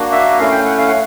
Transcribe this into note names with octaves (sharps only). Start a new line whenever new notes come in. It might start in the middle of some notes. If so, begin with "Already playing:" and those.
Already playing: A#3 D4 F#4
E5
A3 C#4 E4 F5
G5
F#5
F5
F#5